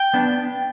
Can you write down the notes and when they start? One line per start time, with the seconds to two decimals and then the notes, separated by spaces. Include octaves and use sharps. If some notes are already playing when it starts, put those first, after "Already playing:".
Already playing: G5
0.14 B3 D4